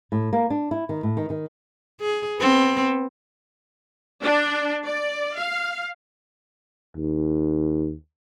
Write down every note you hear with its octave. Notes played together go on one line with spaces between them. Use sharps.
A2
A#3
D4
E4
D#3
A2
D#3
D#3
G#4
B3 C4
D4
D5
F5
D#2